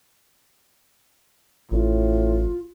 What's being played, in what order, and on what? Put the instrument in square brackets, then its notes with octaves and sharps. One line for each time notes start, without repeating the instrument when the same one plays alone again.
[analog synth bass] A1 [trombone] A2 [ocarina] F4